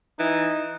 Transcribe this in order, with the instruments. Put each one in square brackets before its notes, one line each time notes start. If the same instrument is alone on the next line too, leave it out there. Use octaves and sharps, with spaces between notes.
[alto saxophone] E3 [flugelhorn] D#4